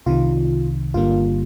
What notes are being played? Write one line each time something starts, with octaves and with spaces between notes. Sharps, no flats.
C2 C3 D#3 F4
G1 G2 D3 G3 A#3 F4